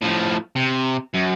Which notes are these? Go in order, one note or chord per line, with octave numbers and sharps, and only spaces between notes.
A2 F3
C3
F#2